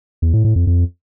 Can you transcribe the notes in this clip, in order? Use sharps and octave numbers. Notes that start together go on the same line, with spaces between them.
E2
A2
A2
F2
F2